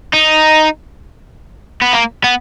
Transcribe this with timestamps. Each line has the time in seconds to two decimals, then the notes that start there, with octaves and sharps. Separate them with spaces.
0.13 D#4
1.82 B3
1.93 A#3
2.24 B3